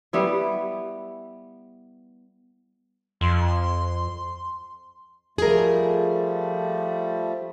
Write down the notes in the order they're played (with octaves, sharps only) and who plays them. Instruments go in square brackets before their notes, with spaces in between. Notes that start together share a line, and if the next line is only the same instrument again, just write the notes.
[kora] G3 B3 E4
[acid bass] F2 [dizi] C6
[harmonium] F3 G3 A3 [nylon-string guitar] G#4 A#4